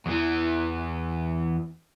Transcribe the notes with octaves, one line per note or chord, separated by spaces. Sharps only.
E2 E3